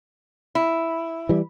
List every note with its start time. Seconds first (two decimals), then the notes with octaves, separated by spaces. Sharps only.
0.55 E4
1.29 E3 G3